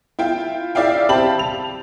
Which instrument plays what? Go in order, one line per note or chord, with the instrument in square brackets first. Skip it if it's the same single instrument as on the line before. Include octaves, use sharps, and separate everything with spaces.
[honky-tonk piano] E4 F4 G5
E4 D5 E5 F5 G5
C4 G4 A5 B5 F#7
F7